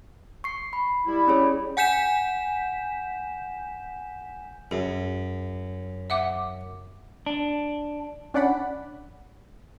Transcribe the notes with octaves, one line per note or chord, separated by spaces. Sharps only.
C#6 C7
B5
G3 E4
C#4 G#4 C#5
F#5 G#5 G6 B6 E7
F#2 G#4
E5 F#5 D6
D4
C#4 D4 D5 F#5 B5